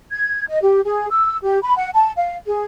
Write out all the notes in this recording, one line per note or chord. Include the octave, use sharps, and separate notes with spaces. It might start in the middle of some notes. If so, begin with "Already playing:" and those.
G#6
D#5
G4
G#4
E6
G4
B5
F#5
A5
F5
G#4